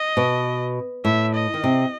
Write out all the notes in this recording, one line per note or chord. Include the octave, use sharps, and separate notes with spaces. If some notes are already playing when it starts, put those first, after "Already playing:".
Already playing: D#5
B2
A2 E5
D#5
D#3
C3